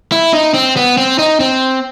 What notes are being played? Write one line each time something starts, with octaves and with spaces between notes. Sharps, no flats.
E4
D#4
C4
B3
C4
D#4
C4